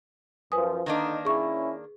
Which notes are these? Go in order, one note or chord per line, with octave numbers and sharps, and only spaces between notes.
F#2 F3 B4 G#5 D#6
D3 D#3 A#3 D4 D#4
C#4 E4 G#4 C#6